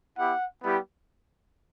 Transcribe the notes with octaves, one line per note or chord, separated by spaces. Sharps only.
B3 E4 G4 F#5
G3 B3 E4 G4